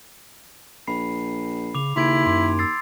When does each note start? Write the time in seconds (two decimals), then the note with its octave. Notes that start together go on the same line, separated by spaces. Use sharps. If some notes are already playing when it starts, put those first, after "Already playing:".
0.87 A#1 B5 C7
1.75 C#3 D6 F7
1.96 D#2 C#3 E4 C6 G#6 D7
2.26 F#2 C6 D6
2.59 E6 A6 C7